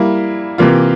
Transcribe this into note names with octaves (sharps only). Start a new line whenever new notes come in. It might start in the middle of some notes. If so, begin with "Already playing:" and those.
Already playing: G3 A#3 E4
C3 E3 A#3 F4